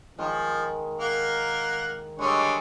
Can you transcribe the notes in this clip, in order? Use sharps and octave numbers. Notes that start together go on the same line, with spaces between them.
D#3 F3 G#3
A#3 A#4 F#5
D3 G3 G#3 C#5 D#5